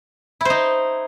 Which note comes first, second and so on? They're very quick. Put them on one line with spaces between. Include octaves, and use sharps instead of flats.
E4 C5 D#4